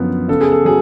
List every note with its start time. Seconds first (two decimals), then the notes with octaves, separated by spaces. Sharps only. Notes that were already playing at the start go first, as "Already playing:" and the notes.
Already playing: F#2 D3 F3 B3
0.28 C#3 A4
0.41 G#4
0.52 A4
0.65 F#3 G#4